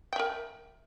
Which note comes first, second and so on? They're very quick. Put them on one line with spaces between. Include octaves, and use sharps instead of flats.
G5 E5 A#4